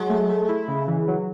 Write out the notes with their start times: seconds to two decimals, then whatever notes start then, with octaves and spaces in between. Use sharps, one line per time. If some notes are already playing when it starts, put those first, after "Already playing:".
Already playing: F#3 G#3
0.09 A3
0.29 A3
0.49 E4
0.68 C#3
0.88 E3
1.08 F#3